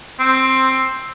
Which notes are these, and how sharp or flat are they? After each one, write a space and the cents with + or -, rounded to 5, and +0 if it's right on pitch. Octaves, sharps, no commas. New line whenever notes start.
C4 +10